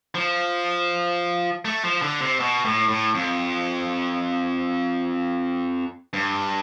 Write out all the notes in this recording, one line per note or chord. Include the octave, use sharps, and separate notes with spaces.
F3
A3
F3
D3
C3
B2
A2
A2
F2
G2